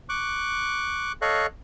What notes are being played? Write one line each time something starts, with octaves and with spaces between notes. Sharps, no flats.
C#6 D6 F#6
A4 C#5 D#5 F5 C#6 F#6